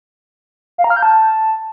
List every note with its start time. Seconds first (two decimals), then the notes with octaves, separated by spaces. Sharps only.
0.78 F5
0.84 A#5
0.90 F6
0.96 G6
1.03 A5